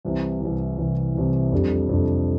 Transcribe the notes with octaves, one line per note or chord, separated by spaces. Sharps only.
C2 C3 E3
C2 C3 E3
C2 C3 E3
C2 C3 E3
F2 C3 G3 D4 A4
F2 C3 G3 D4 A4